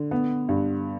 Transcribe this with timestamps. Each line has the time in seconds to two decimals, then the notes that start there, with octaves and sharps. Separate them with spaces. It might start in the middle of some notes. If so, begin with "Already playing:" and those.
Already playing: D3
0.11 B3
0.49 G2